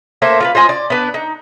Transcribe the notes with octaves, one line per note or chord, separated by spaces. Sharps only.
A3 A#3 C5 E5
F4 A#4 B4
F4 C5 D#5 G#5
D5
B3 D4 B4
D#4